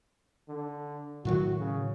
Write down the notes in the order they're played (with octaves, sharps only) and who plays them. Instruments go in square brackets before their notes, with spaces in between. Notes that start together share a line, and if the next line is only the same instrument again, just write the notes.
[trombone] D3
[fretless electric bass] A2 D#3 F#3 [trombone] F#4
[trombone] C#3